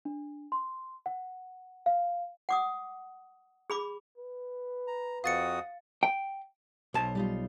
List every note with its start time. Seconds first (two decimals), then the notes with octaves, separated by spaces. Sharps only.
0.05 D4
0.52 C6
1.06 F#5
1.86 F5
2.49 F#5 D6 D#6
3.70 G#4 B5 D6
4.18 B4
4.87 A#5
5.24 F2 F#4 F5 D#6 A6 C#7
6.03 G5
6.94 B1 C5 C#5 A5
7.15 G3 D#4 F4